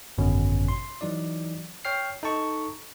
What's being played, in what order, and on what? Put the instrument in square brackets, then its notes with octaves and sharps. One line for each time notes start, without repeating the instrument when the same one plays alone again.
[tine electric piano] G#1 F#2 B2 D3 C#4
C6
E3 F#3 D#4 D5
C#5 G5 F6 C7
D#4 A4 D#5 A5 C#6